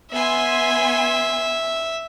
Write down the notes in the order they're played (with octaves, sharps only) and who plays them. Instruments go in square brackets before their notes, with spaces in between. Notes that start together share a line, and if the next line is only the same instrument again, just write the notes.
[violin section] B3 G#5 C6 [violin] E5